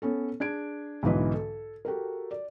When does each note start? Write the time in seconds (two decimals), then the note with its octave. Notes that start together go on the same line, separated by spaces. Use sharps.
0.02 B3 C#4 A4
0.40 D4 G#4 G#6 D7
1.03 B1 G#2 D3 E3 B4 D#5
1.33 A4
1.85 F#4 G4 A4 A#4
2.31 D5